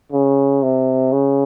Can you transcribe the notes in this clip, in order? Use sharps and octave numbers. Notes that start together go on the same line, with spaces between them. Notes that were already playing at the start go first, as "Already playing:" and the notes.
C#3
C3
C#3